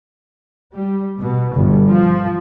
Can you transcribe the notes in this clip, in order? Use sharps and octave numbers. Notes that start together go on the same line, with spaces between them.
G3
B2
G1
F3